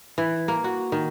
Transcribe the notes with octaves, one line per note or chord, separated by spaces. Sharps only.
E3
A#3
F#4
D#3